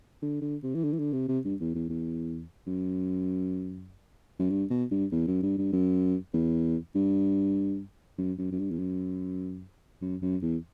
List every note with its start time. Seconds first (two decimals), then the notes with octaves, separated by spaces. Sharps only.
0.22 D3
0.42 D3
0.63 C3
0.75 E3
0.84 D3
0.93 E3
0.99 D3
1.13 C3
1.28 C3
1.44 G2
1.60 E2
1.75 E2
1.90 E2
2.67 F#2
4.39 F#2
4.50 G2
4.70 B2
4.91 G2
5.12 E2
5.27 F#2
5.43 G2
5.58 G2
5.73 F#2
6.34 E2
6.95 G2
8.18 F#2
8.38 F#2
8.52 F#2
8.59 G2
8.71 E2
8.79 F#2
10.02 F#2
10.22 F#2
10.42 E2